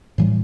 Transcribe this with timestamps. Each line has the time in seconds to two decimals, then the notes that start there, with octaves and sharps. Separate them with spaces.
0.18 A2 E3 G3